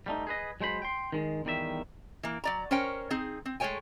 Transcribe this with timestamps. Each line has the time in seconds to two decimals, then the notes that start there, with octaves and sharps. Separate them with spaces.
0.06 G3 A3 D#4
0.27 G#4 B4 D#5
0.60 F#3 G#3 C5 B5
0.82 G5 C6
1.12 D#3 G#3
1.45 E2 D#3 G3 D5 E5
2.23 E3 A#3
2.44 F#3 D5 A#5
2.71 C#4 A#4 C5 C#5 G5
3.10 C4 D#4 G#4
3.45 C4
3.60 G#3 A3 B4 C#5 G5 G#5